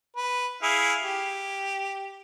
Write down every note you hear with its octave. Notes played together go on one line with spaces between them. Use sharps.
B4
E4 G#4 F5
G4